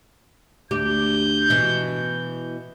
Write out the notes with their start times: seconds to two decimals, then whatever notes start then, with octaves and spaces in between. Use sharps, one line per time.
0.71 D2 G4 G6
1.50 B2 E3